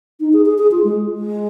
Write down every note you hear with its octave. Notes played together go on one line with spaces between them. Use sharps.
D#4
G#4
G#4
G#4
F4
G#3
G#3